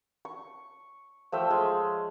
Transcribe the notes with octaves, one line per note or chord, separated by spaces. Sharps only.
C#6
F3 A3 E5 G5
G#3 F4